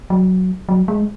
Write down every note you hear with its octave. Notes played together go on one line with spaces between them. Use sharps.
F#3
F#3
G#3